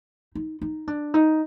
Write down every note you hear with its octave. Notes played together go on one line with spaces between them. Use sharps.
D#4
D#4
D4
D#4